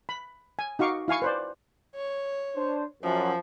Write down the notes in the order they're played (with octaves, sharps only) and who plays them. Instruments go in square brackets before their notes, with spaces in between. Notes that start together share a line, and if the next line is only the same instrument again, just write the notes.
[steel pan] B5
G#5
D#4 F#4 F5 C#6 D6
E4 F5 G#5 C#6
B4 C5 D5
[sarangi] C#5
[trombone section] D4 C5
[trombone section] F#2 [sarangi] F3